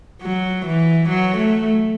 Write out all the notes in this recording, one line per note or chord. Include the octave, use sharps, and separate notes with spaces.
F#3
E3
F#3
A3